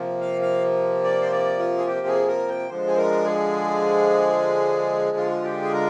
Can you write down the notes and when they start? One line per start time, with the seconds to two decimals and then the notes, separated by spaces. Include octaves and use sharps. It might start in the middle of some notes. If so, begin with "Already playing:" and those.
Already playing: C3 F3 A#3
0.21 F5
0.42 F5
1.04 D5
1.22 C5
1.32 D5
1.59 F4
1.78 G#4
1.87 G4
2.07 G#4
2.28 A#4
2.49 G5
2.69 D3 F3 G#3 C5
2.87 G#4
2.97 A#4
3.24 G#4
5.17 F4
5.44 G4
5.62 G#4
5.73 A#4